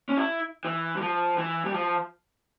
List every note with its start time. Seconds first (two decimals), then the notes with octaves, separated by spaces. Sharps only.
0.09 C#4
0.17 E4
0.65 E3
0.96 G3
1.01 F3
1.38 E3
1.65 G3
1.74 F3